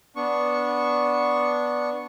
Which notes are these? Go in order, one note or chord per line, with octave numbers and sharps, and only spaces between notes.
B3 D4 C#6